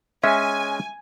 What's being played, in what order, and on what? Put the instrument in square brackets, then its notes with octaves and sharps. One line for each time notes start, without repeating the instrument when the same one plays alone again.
[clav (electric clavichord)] G#3 C#4 [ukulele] E5 [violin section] G#5